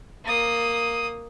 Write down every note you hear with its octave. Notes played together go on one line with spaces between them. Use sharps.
A#3 D#6